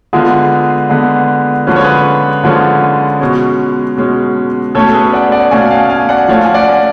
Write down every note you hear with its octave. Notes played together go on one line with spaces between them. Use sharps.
D3 G#3 B3 F4 G#4
D3 G#3 B3
D3 F3 G#3 C#4 B4
C#5
G#4 B4
D3 F3 G#3 C#4
B2 G#3 C#4
B2 G#3 C#4
B2 A3 C#4 A4 C#5
A4
G#4 B4
D5 F#5
D5 F#5
B2 A3 C#4 F5 G#5
F5 G#5
F5 G#5
D5 F#5
F3 A3 C#4 C#5 F5
G#5
D5 F#5